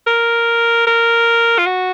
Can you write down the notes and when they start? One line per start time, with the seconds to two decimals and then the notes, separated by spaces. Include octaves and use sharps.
0.07 A#4
0.87 A#4
1.58 F4
1.66 F#4